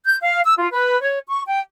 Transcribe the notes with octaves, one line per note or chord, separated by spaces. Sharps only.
G6
F5
E6
F4
B4
C#5
C#6
G5